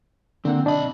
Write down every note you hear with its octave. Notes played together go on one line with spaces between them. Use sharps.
D3 A#3 C4 F#5
B1 D4 D#5 B5